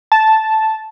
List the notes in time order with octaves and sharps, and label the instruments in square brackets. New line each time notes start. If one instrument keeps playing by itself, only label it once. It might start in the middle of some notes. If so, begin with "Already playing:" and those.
[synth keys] A5